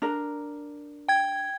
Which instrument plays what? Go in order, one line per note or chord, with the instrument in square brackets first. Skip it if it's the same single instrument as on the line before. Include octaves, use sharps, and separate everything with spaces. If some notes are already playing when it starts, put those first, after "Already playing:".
[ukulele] D4 A#4
[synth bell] G5 G#6